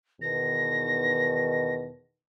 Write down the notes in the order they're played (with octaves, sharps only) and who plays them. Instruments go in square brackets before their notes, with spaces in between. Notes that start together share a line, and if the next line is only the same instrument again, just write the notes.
[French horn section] E2 B2 D#3 [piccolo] A#6